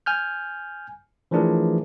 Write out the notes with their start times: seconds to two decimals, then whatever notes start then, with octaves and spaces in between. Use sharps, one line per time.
0.06 G#5 F6 G6
1.31 E3 F3 A3 D4 G#4 A#4